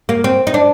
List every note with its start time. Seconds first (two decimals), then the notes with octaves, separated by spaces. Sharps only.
0.09 A#3
0.24 C4
0.47 D#4
0.54 D4